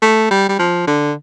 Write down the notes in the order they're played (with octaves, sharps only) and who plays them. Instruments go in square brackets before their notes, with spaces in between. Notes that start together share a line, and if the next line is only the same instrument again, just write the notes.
[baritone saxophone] A3
G3
G3
F3
D3